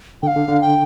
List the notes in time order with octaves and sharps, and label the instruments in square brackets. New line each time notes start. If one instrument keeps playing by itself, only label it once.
[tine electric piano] D3 [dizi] G5
[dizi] F5
[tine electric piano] D3
D3
[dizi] G5